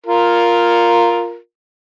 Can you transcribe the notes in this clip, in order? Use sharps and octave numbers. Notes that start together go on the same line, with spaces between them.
F4 A#4